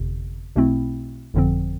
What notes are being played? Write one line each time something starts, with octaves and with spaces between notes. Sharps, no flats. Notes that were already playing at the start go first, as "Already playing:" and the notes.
Already playing: G1 F2 C3
B1 B2 A3 C4 E4
G1 F2 D3 F3 C4